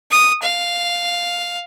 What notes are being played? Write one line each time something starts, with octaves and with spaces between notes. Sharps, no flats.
D#6
F5